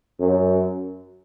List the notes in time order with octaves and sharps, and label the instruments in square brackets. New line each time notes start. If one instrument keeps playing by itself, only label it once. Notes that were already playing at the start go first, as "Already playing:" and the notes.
[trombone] F#2